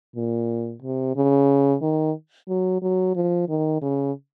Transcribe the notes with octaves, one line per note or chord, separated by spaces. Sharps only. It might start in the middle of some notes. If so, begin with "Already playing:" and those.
A#2
C3
C#3
D#3
F#3
F#3
F3
D#3
C#3